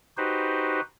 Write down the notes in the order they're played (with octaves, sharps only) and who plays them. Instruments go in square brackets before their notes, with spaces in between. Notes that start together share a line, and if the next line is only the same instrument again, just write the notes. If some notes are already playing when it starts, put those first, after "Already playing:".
[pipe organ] D#4 F#4 G4 B4 C5